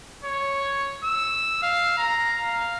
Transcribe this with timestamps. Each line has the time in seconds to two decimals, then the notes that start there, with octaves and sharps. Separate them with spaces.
0.24 C#5
1.04 E6
1.63 F5
1.98 A#5
2.43 F5